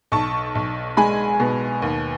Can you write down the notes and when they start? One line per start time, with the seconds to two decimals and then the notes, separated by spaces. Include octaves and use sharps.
0.12 B1 A5 C#6
0.55 B1
0.97 G#3 G#5 B5
1.40 B2
1.82 D#2